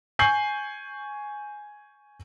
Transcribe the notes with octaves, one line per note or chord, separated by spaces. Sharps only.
G#5 C#6 G6 C7 F#7